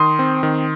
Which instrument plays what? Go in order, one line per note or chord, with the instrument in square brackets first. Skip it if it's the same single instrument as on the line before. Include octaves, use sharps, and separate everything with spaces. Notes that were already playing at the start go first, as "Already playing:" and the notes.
Already playing: [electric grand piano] D#3 C6 D#6
C4
D#3